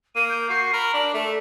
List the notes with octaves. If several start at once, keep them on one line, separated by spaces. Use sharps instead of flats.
A#3 D#7
G6
F#4 C7
A#4 B5
D4 F#7
A3 E5